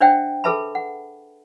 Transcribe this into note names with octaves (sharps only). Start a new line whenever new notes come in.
D4 C5 D5 E5 F#5 G5
G#4 A4 B4 E5 A5 B5
F#5